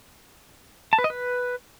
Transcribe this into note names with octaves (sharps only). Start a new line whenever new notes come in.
A5
B4
D#5
B4